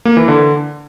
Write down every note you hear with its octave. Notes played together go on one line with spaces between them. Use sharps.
A#3
E3
D3